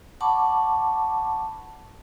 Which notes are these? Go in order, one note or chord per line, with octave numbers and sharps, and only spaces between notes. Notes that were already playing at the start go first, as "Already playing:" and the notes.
F#5 A5 B5 C#6 D6